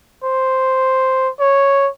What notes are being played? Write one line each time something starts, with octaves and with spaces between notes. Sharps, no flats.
C5
C#5